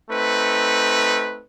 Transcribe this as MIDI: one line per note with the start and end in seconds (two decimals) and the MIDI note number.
0.10 1.43 57
0.10 1.43 60
0.10 1.43 63
0.10 1.43 71